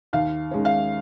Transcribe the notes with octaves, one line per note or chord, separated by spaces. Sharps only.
D#2 F5
D#3 G#3 C#4
F5